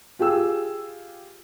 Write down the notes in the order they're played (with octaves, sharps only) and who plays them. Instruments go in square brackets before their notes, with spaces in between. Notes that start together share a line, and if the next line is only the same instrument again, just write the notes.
[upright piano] F4 G4 G#4 E6